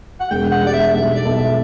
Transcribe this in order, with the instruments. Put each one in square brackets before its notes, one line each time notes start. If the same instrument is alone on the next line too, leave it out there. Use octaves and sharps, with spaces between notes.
[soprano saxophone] F#5
[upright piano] E1 [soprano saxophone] G5
[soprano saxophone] F#5
[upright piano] G3 [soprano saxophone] D5
[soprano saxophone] E5
[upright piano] B1 [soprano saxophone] E5
[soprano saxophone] D5
[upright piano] B1
[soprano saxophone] E5